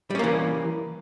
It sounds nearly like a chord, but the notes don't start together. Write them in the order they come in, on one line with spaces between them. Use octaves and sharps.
G3 C#4 A#3 E3